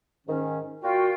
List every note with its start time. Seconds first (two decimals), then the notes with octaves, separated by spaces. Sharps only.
0.26 G#2 D#3 C#4
0.82 A#2 F4 F#4 G5